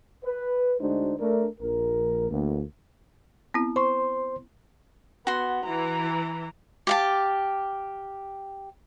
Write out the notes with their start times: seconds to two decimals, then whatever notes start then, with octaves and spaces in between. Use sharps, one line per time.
0.24 B4
0.80 D2 G#3 D4 D#4 F#4 C5
1.19 A3 D4 A#4
1.60 A#1 A#4
2.30 D2 A#3
3.54 B3 C4 E4
3.76 C5 C6 C#6
5.27 B3 F#4 C6
5.65 E3 A#5
6.87 G4 F5 A5